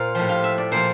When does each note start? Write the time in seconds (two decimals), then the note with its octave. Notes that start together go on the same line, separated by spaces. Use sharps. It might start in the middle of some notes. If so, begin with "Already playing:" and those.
Already playing: A#2 F4 A#4 C5
0.15 A2 F3 G4
0.29 F4
0.44 E5
0.58 D5
0.72 A#2 F3 C5